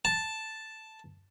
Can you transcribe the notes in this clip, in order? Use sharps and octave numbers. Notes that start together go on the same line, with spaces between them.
A5